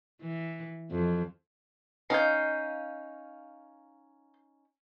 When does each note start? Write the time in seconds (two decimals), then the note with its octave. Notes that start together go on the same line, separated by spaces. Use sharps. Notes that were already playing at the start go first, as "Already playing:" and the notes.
0.22 E3
0.91 F2
2.10 C#4 D#4 F5 G6